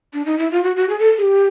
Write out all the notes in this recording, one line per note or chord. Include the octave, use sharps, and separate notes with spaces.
D4
D#4
E4
F4
F#4
F#4
G#4
A4
G#4
G4